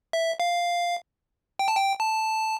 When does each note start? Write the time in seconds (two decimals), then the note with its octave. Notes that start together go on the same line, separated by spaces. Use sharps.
0.13 E5
0.40 F5
1.59 G5
1.68 A5
1.77 G5
2.00 A5